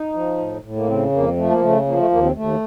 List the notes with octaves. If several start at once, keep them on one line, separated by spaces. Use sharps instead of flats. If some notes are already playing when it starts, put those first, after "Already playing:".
Already playing: D#4
F3
A2
A2
A#3
C#3 C4
F2 A#3
F3 A3
A#3
C#3 A3
F3 A#3
A3
D#2 A#3
C4
D#2 A3